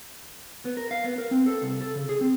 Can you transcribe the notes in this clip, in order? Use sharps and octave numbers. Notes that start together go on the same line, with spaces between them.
B3
A#4
F5
B3
A#4
C4
A4
C2
A4
C#3
G#4
C4